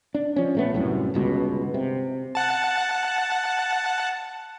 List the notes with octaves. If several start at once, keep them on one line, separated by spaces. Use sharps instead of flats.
D4
F3 C#4
A#1 A3 B3
C2 F#2 A2
G1 C#2 B2
C3
F#5 A5